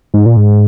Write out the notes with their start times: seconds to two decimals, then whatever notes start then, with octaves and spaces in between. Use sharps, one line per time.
0.14 G#2
0.26 A#2
0.37 G#2